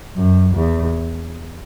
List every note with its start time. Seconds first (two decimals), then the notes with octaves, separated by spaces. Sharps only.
0.16 F#2
0.55 E2